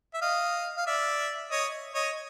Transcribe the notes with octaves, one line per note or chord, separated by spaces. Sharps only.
E5
D#5 F5
F5
D5 E5
C#5 D#5
C#5 D#5